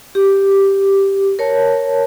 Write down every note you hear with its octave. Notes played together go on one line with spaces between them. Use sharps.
G4
A#4 C#5 A5